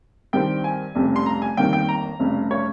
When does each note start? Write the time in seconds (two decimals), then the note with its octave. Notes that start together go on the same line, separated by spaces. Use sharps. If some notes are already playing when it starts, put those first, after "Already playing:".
0.33 G2 D#3 G3 C4 G5
0.64 G#5
0.95 F1 F2 C#3 G3
1.16 C6
1.26 A#5
1.42 G#5
1.57 G1 F2 D#3 G3 A#3 G5
1.73 G5
1.89 A#5
2.20 F1 F2 C#3 G3
2.51 C#5